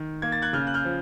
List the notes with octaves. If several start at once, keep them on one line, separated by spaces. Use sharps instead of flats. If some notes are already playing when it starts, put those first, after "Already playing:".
Already playing: D#3
A#3 G#6
A6
F#6 G#6
C#3 F6 G6
F#6
F6 G6
F3